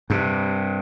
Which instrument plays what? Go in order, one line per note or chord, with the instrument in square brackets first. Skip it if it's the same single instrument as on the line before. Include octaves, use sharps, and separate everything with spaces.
[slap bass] G2 C3